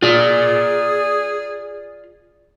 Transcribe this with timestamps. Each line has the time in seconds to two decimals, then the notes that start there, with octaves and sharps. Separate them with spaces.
0.03 F4 G#4 D5